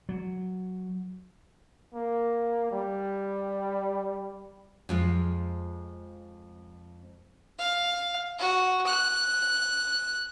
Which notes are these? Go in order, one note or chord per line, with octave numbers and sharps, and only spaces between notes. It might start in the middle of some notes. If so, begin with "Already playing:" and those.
F#3
A#3
G3
F2 G#3 F4
F5
F#4
F#6